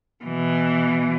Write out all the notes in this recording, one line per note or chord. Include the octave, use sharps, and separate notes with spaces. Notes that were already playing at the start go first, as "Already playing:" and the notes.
B2 E3